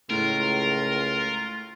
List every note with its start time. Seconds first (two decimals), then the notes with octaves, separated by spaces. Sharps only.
0.10 C#2 A2 F4 A#4